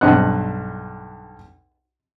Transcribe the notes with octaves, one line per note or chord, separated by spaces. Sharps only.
B1 G2 C5 D#5 F#5 F#6